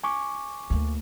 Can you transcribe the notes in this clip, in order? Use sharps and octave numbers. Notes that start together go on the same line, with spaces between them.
G#5 C#6 D6
D2 A#3